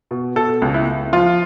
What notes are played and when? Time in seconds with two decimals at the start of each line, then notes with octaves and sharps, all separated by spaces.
0.11 B2
0.36 B2 A4
0.62 C#2
0.74 E4
0.86 C#2
1.13 F3 F4